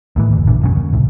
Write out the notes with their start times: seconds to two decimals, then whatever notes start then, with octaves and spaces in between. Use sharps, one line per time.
0.16 D#2 A2 E3
0.33 F1 D2
0.47 D#1 A#1 E2 D3
0.61 E1 F#2 C#3
0.76 D#2
0.93 D1 C2